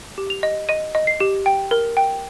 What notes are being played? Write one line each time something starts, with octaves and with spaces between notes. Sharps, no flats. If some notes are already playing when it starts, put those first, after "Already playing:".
G4
F7
D#5
D#5 D#7
D#5
C7
G4
G5
A#4
G5